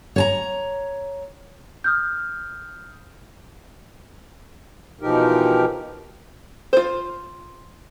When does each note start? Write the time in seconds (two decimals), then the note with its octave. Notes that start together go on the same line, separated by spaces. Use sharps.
0.16 C#5 A5 A#5
1.84 D#6 F6 G6
5.01 B2 E3 F3 D#4 G4 A#4
6.73 F4 C5